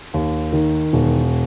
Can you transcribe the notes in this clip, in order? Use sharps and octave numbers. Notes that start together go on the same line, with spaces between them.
D#2
D#3
E1